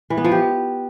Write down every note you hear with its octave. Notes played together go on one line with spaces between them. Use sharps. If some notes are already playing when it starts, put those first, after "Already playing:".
E3
B3
F3
G4